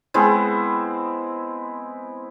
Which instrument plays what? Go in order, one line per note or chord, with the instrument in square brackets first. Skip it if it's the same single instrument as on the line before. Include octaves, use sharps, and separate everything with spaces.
[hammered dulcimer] G#3 B3 C4 E4